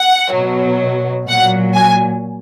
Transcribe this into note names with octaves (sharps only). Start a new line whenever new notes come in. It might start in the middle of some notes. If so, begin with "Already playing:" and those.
Already playing: F#5
B2 F#3
A#2 F#3 F#5
G#5